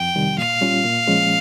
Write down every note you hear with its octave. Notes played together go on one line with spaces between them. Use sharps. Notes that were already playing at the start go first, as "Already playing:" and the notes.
Already playing: F2 G5
C3 D#3 G3
A#2 F5
G3 C#4 F4
A#2
F3 G#3 C#4